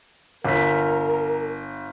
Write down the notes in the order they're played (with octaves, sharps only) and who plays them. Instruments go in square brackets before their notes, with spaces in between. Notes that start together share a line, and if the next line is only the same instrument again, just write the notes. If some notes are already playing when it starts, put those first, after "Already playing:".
[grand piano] G1 B6 [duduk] A#4